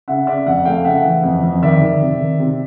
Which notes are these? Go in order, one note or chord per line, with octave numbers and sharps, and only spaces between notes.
C#3 E5 F#5
C#3 D5 E5
F2 E5 F#5
A3 F5 G5
C#3 E5 F#5
E3
F2
F2
D#3 D5 E5
D#3
C3
D#3
C3